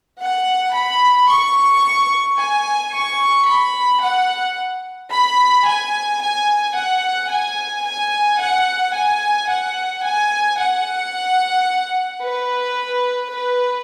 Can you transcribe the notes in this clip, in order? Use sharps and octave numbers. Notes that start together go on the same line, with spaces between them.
F#5
B5
C#6
G#5
C#6
B5
F#5
B5
G#5
G#5
F#5
G#5
G#5
F#5
G#5
F#5
G#5
F#5
B4
B4